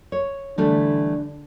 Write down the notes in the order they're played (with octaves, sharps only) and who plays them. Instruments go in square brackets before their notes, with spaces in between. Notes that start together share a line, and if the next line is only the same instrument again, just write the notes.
[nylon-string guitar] C#5
[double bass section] D3 [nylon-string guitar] E3 G3 A3 [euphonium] D4